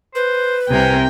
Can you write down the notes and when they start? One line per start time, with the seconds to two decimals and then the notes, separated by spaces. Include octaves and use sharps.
0.15 B4 C5
0.70 C2 C3 A#4 G5 G#5